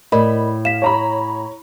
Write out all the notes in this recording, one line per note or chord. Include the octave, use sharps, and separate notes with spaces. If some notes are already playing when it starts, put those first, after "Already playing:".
A2 A#4 D5 D#5 B5
F5 B6 E7
C#5 A#5 B5